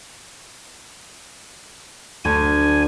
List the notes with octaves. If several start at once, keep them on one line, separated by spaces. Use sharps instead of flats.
D2 G#5